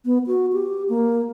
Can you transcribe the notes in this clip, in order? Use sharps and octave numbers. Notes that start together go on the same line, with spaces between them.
B3
F#4
G4
A#3